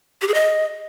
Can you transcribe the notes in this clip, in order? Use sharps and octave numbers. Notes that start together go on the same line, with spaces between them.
G4
G#4
D#5